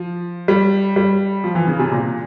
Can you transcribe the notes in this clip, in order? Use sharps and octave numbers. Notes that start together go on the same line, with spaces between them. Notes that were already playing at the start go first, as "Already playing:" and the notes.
Already playing: F3
G3
G3
F3
E3
C#3
C3
A#2